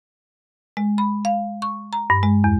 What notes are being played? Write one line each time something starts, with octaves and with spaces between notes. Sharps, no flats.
G#3
B5
F5
C#6
A#5
G2
G#3
E2